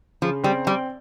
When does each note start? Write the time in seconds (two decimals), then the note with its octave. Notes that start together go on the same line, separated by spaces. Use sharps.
0.22 C#3 F3
0.44 G3 C4
0.67 G3 C4